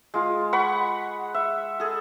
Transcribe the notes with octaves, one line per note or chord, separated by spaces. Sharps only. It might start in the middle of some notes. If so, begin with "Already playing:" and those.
G#3 F4
F#5 B5 C#6
E5
G#4 A4